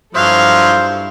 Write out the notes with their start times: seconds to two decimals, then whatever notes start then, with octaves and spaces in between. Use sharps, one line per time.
0.15 G2 F3 F#3 E4 A4 C5 F5